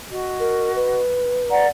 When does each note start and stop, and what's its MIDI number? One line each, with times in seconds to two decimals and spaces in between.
0.10 0.99 66
0.10 0.99 75
0.40 0.74 70
0.76 1.67 71
1.50 1.66 74
1.50 1.66 78
1.50 1.66 82